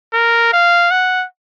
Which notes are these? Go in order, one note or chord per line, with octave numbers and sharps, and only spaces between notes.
A#4
F5
F#5